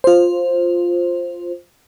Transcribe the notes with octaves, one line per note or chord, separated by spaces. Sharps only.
F4 C5